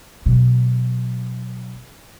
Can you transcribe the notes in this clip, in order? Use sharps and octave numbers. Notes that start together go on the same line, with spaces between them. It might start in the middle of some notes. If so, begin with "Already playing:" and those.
B2 F#3